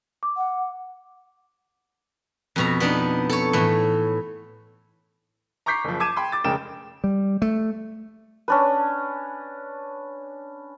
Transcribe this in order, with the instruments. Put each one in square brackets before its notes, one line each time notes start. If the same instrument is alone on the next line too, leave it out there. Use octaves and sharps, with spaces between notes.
[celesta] D6
[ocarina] F#5
[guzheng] F2 B2 A#5
B3 D4 D#4
A4 C#5
A2 E3
[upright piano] A#5 C#6 D6 G6 B6 C7
F#1 F3
A5 D6 G#6 D#7 E7
G5 B5 C6
D6 A6
F1 C#3 G#3 A#4 G5 E7
[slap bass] G3
A3
[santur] C#4 D4 B4